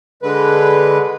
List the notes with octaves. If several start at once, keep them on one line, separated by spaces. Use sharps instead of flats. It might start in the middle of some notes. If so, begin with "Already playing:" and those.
D3 G#3 B4